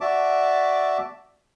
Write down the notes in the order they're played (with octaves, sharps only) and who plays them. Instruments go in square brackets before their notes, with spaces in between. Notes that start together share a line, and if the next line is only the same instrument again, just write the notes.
[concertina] F#4 D5 E5 A5 D6